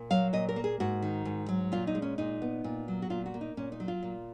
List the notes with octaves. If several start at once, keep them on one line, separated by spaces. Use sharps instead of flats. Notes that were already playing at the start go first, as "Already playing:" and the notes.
Already playing: A#2
F#3 F5
A#2 D#5
A#4
A#3
G#4
G#2 F#4
D#3
G#2
F#3
A#2 F4
D#4
G#3
C#4
A#2 D#4
B3
A#2
F#3
F#4
A#2 F4
F#4
A#3
D#4
A#2 C#4
D#4
F#3
F4
A#2